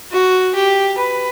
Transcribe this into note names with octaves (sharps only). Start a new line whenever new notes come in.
F#4
G4
B4